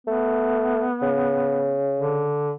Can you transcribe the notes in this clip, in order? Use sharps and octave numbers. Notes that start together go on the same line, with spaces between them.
A3 B3
C#3
D3